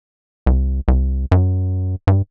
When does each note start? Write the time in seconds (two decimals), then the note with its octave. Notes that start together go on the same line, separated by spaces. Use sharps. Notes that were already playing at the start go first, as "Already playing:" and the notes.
0.46 C2
0.88 C2
1.32 F#2
2.07 G2